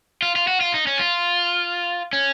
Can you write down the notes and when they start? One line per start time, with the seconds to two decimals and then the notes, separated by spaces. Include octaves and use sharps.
0.22 F4
0.36 F4
0.47 F#4
0.61 F4
0.74 D#4
0.87 C#4
0.99 F4
2.13 C#4